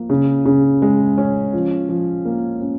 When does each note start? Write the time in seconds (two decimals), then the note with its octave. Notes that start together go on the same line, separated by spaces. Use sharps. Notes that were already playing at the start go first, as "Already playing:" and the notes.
Already playing: F3 A#3
0.10 C#3
0.45 C#3
0.82 G#3
1.18 C#4
1.53 F3
1.89 F3
2.25 A#3
2.61 C#4